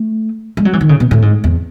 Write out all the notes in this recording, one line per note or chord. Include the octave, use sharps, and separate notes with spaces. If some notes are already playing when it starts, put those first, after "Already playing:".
Already playing: A3
G#3
F#3
E3
D#3
C#3
B2
A2
G#2
E2